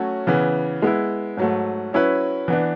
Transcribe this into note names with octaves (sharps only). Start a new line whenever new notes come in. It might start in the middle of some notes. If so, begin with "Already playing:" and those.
Already playing: F#3 A3 C#4 F#4
C#3 E3 B3
G#3 B3 E4
G#2 F#3 A3
F#3 C#4 E4 B4
E3 B3 D4